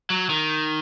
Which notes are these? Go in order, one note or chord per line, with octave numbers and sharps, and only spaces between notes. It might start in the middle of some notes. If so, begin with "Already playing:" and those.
F#3
D#3